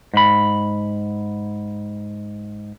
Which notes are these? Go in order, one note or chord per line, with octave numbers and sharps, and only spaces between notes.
G#2 B5